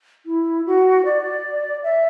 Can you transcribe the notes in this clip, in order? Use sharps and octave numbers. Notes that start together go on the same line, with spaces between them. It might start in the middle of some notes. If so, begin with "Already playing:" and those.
E4
F#4
D5
E5